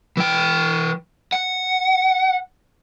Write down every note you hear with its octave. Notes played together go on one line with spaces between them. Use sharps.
E3 G5
F#5